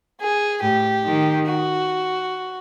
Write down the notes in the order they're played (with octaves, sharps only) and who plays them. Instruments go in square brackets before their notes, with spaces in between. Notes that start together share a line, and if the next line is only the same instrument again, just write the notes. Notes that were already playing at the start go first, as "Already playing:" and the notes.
[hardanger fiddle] G#4
[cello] A2 [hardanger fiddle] G4
[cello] D#3
[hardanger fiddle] F#4